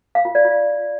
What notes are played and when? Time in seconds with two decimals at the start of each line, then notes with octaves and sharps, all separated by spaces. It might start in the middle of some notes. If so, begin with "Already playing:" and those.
0.15 F5
0.25 F4
0.35 D5
0.45 F4